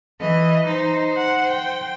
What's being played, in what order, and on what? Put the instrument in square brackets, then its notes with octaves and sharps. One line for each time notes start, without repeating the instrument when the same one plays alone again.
[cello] E3 [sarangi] D#5
[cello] D#4 [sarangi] C5
[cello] F#5
G5